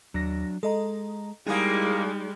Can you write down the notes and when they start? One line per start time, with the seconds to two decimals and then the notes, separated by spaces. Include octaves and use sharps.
0.14 D#2 F#3 D4 A#6
0.63 G#3 A4 D#5 A#5
1.47 G3 G#3 A#3 D#4 E4 G#4 G#5 D#6